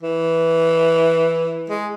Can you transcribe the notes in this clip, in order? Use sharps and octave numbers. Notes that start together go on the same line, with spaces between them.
E3
G#3